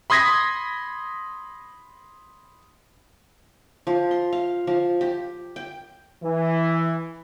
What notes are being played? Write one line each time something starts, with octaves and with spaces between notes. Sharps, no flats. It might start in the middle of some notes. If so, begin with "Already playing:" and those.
B5 C6 D#6 G#6 A#6 B6
F3
C6
F5
F3
G4
G5
E3